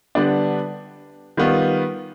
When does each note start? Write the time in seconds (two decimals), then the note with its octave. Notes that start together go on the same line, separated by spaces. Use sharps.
0.15 D3 G3 B3 D4
1.37 D#3 G3 B3 F4